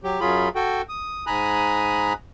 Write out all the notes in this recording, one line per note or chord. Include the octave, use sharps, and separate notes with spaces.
F#3 G4
F#2 F#3 F4 G#4 B5
F#4 A4 G5
D#6
G#2 G#5 A#5 B5 D#6 F#6